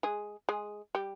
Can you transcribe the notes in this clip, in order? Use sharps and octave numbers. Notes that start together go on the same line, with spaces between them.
G#3 G#4
G#3 G#4
G3 G4